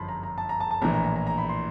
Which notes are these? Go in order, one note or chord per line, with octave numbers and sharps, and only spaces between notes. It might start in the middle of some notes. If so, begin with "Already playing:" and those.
Already playing: G1 F#2 D3 F3 A5 B5 C6
A#5
A#5
A5
A#5
A5
A5
A#1 A2 E3 A#5
A#5
A#5
A#5
A#5
B5
C6